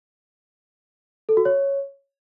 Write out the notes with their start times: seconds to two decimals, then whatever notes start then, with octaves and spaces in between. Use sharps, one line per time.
1.29 A4
1.37 F#4
1.45 C#5